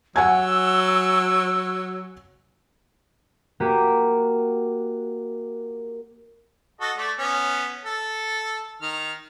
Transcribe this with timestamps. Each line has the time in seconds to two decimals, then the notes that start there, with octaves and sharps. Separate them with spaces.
0.16 F#3 F#5 G#5 E6 G#6
3.60 A#3 F#4 G4 D6 B6 D#7
6.81 F#4 A4 D#5
6.98 A3 D5
7.19 B3 C#4
7.85 A4
8.82 D#3 F6